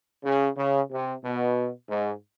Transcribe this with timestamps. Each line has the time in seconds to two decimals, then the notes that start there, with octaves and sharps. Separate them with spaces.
0.25 C#3
0.57 C#3
0.91 C3
1.23 B2
1.89 G#2